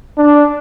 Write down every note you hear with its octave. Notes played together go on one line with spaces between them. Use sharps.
D4